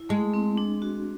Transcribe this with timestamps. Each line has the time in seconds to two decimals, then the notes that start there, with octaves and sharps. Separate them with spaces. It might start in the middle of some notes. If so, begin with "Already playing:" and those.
Already playing: E4
0.09 G#3 A3
0.34 C4
0.57 D4
0.82 F#4